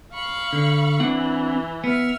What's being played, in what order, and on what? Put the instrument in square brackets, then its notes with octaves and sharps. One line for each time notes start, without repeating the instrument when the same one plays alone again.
[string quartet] F5 B5 C#6
[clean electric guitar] D3
[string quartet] E3 [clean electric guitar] C4 D4 F#5
[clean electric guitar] B3 [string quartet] E5 F6